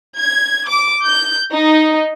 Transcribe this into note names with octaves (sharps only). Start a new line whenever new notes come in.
G#6
D6
G6
D#4